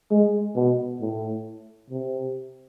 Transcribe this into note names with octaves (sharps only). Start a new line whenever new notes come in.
G#3
B2
A2
C3